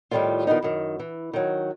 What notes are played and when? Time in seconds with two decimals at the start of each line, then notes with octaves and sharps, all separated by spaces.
0.11 A2 D#3 G3 G#3 A#3 F4
0.47 D#3 F3 G3 B3 D#4
0.63 F#2 D#3
1.00 E3
1.33 D#3 F#3